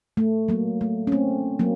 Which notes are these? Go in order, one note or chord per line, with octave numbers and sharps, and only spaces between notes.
A3
F#3 A#3
A3
C#4
A3 C4
F#3 A#3